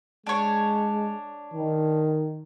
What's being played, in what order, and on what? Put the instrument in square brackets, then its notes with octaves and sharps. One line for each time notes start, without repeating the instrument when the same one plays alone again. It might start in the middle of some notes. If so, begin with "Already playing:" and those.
[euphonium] G#3 [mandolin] D4 C#5
[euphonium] D#3